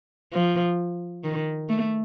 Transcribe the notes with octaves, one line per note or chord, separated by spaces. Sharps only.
F3
D#3
A3